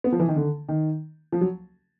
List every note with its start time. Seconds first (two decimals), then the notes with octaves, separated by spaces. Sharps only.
0.04 B3
0.12 F3
0.20 E3
0.28 D#3
0.36 D3
0.69 D#3
1.32 F3
1.41 F#3